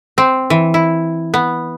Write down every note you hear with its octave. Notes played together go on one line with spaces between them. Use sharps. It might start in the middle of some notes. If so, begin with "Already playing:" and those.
C4
E3
E4
B3